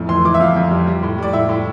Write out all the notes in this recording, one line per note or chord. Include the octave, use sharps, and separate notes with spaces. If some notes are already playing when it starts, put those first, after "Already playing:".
Already playing: F2 A2
E3 C6
E3 D6
E5
F2 F5
F2
G3
G3
A2
G3 D5
A2 E5
A2